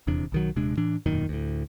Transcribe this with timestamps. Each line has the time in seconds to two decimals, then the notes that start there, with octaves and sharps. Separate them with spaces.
0.07 D#1 E2 C3 D4
0.32 B1 D#3 F#3
0.56 D#1 C3 G#3 D4
0.77 A2 E3 D4
1.06 E1 F#2 A#2 D#3
1.29 D2 A2